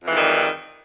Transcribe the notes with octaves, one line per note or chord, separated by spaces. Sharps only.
F2 G#2 D#3 E3 G3